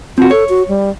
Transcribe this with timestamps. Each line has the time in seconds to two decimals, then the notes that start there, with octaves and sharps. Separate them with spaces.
0.18 C4 F4 F#4
0.31 A4 C#5
0.49 F#4
0.69 G3